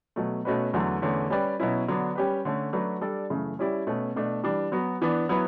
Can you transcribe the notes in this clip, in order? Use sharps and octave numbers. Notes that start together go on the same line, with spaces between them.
B2 F#3 A3
B2 A3 C#4 F#4 B4
E2 D3 F#3 A3
E2 D3 A3 C#4
G3 C#4 G4 B4 D5
B2 F#3 C#4 E4
D3 F#3 B3 D4
G3 C#4 G4 B4
D3 A3 C#4
F#3 A3 D4 F#4 B4
G3 D4 A4 D5
F#2 C#3 E3 A3
G3 C#4 E4 G4 D5
B2 A3 C#4
B2 A3 D4
E3 G3 D4
F#3 B3 F#4
E3 B3 D4
F#3 B3 E4 B4